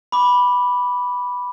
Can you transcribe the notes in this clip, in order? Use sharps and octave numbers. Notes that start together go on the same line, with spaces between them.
B5 D6